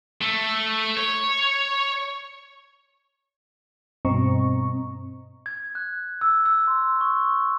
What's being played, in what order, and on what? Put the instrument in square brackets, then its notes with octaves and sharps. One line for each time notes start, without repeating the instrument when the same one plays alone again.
[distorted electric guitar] A3
C#5
[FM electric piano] G2 B2 C4 D#5 A#5 C#6
[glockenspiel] G#6
F#6
E6
E6
C6
C#6